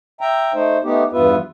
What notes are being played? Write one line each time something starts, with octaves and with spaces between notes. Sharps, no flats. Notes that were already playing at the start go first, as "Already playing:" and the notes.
E5 G5 A#5
A3 D#4 C5
A3 B3 D#4 G4
E2 G2 B3 F4 B4 E5